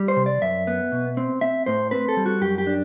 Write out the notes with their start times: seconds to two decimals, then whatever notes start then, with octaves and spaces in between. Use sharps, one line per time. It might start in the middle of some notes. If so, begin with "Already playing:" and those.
Already playing: G3
0.08 C5
0.17 C3
0.26 D5
0.42 F#2 E5
0.67 B3
0.92 B2
1.17 C4
1.41 C4 E5
1.66 A2 C5
1.91 C4 B4
2.08 A4
2.17 G3
2.26 F#4
2.41 F#2 G4
2.58 G4
2.67 D4